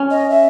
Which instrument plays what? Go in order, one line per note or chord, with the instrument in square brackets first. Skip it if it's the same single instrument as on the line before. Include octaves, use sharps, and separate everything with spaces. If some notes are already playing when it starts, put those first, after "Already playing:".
Already playing: [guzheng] C#4
[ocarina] D#5
E5